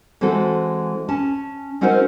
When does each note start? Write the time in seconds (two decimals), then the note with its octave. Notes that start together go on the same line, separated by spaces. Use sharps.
0.21 E3 G#3 C4 F#4 A4
1.09 C#4 A5
1.81 C4 C#4 D#4 F#4 A#4 C5